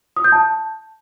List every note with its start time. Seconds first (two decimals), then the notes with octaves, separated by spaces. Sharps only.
0.16 D#6
0.24 G6
0.32 A5